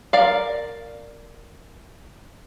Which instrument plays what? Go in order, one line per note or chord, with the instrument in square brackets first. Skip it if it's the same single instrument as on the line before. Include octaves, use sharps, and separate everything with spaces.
[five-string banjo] A#4 D5 F5